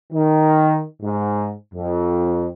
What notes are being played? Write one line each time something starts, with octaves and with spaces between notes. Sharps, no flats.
D#3
G#2
F2